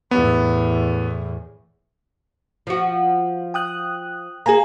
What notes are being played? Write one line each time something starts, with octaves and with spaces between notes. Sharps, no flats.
E2 A2 B3
F3 F#4
G5 D#6 F#6
A#3 G#4 G#5 A#5